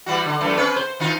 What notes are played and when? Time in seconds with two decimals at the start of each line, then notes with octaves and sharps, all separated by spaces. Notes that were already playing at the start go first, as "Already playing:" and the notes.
0.06 E3 G3 F#4
0.26 D3
0.41 F#2 E3 A3
0.57 C4 C#4 B4
0.76 C5
1.00 D#3 D#4 F4